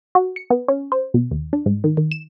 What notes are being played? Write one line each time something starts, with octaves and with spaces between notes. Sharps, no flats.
F#4
C#7
B3
C#4
C5
B2
D#2
D4
G#2
D#3
D#3
E7